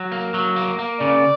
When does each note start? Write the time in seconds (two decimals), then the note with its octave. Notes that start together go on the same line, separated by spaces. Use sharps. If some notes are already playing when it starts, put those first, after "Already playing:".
Already playing: F#3
0.12 A#3
0.34 F#3
0.56 A#3
0.79 A#3
1.00 C#3 D5